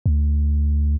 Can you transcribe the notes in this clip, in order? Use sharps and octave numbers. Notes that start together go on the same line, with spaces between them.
D2